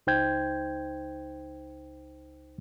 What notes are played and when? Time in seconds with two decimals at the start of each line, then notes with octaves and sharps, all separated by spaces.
0.07 C#2 D#4 C5 G5 G6 G#6